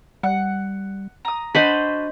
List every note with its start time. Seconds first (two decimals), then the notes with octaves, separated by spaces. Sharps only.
0.23 G3 F#5
1.25 A#5 D#6
1.55 D4 F#4 B4 C5 D#5 A5 B5